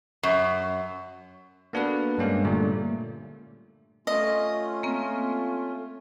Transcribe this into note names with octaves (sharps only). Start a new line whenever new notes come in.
F#2
A#3 B3 D4 F#4 A4 B4
G2 G#3 A#3 C#4
A#2 D3 G3 A3
A3 C#4 F4 D#5
A#3 C4